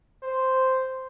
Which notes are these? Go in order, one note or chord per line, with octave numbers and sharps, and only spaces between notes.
C5